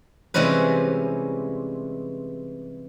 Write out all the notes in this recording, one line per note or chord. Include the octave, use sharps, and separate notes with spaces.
C3 E3 G3 G#3 C#4 B4